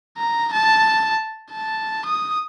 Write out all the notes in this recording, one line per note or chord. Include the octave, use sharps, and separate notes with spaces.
A#5
A5
A5
D#6